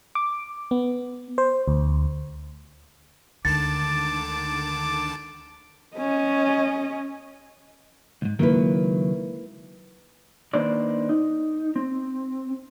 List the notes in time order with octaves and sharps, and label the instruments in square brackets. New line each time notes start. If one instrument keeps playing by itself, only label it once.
[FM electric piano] D6
B3
C5
D2
[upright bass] D2 G#3 [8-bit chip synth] D3 D#3 A5 [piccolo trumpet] D6 [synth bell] A6
[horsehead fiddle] C#4 D#5
[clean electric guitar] C#2 G#2
[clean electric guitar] C#2 D#3 F#3 [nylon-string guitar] A#3 E4 B4
[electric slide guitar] D#3 A#3 D4 B4 C5 D5
D#4
C4